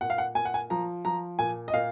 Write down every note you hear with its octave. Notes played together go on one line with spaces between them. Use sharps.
A#2 F#5
F5
F#5
A#2 G#5
F#5
G#5
F3 A#5
F3 A#5
A#2 G#5
D#5
A#2 F5